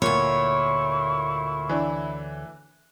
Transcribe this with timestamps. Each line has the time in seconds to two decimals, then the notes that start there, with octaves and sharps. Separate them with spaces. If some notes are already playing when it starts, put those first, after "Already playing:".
0.02 D2 A#2 E4 C#5 C#6
1.69 E3 D4